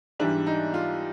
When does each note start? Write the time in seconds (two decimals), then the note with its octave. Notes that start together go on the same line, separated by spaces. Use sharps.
0.19 G#2 E3 G3 D4
0.46 D#4
0.74 F4